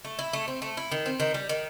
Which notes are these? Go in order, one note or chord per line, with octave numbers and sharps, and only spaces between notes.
A3
E4
A3
C4
A3
E4
D#3
C4
D#3
G3
D#3